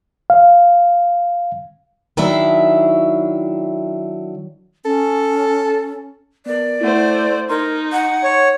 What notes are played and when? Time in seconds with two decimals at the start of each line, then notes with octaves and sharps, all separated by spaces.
0.30 F5
2.17 D#3 F#3 D4 E4 E5
4.85 C#4 A4
6.46 B3 A#4 D5
6.81 A3 E4 C5 F#5
7.49 D#4 A#4 C6 G#6
7.92 F#5
8.24 C#5